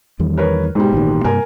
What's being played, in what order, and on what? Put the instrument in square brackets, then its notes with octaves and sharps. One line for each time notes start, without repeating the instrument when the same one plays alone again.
[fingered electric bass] E2 D#3 G3
[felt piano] A#4 B4 C#5
[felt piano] G#2 B2 G3 [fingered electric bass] G#3
[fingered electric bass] A1 A#2 D#3
[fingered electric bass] G2 C3 A#3 [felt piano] A#4 G#5